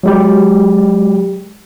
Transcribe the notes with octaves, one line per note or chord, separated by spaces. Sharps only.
F#3 G#3 G4